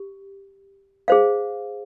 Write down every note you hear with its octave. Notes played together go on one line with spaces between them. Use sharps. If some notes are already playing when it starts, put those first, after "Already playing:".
Already playing: G4
G#4 C5 F5